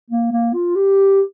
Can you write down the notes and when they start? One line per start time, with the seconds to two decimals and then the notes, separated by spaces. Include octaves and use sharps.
0.11 A#3
0.32 A#3
0.54 F4
0.75 G4